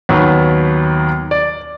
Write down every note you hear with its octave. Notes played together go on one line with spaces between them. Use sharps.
D#2 F#3 B3
D5